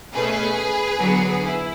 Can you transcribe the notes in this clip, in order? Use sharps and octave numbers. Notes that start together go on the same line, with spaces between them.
B2 A3 C#4 G#4 B4
D3 F#3 B3
E4